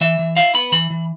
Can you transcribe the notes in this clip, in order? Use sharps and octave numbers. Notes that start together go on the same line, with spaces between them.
E3 E5
E3
E4 F5
B3 B5
E3 B5
E3